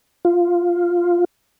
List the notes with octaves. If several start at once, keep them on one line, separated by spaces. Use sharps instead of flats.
F4